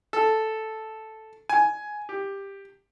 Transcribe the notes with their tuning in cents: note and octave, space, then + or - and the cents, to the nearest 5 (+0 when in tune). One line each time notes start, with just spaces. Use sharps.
A4 -5
G#5 +10
G4 +10